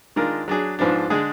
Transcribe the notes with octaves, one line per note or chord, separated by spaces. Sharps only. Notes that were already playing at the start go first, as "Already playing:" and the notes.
D#3 G#3 D4 F4 A#4
F#3 D4 G#4
G#2 F3 B3 D4
D3 G#3 D4 G#4